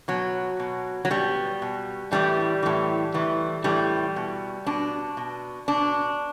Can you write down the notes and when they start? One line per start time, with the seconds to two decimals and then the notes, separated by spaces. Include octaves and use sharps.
0.08 B2 F#3
0.60 B2
1.05 F#3
1.10 B2 G3
1.62 B2
2.12 A2 E3 G3
2.63 A2 E3
3.14 A2 E3
3.64 A2 E3 G3
4.16 B2
4.66 B2 D4
5.17 B2
5.68 B2 D4